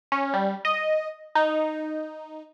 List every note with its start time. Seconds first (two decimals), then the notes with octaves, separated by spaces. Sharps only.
0.12 C#4
0.34 G3
0.65 D#5
1.35 D#4